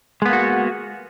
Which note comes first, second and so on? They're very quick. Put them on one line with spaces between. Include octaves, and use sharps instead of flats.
G#3 B3 A#3 F#4